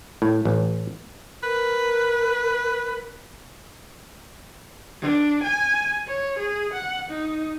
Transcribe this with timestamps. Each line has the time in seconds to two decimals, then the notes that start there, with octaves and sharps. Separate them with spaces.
0.22 A2
0.45 A1
1.43 A#4 B4
5.01 D4
5.43 G#5
6.07 C#5
6.38 G#4
6.73 F#5
7.10 D#4